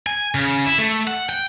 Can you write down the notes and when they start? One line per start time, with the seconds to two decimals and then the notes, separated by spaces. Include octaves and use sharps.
0.07 G#5
0.35 C#3
0.66 E4
0.79 A3
1.07 F#5
1.29 G5